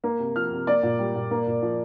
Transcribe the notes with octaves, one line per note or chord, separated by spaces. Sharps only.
A#3
C3
F3 F6
C3
A#3 D5
A#2
G3
A#2
A#3
A#2
F3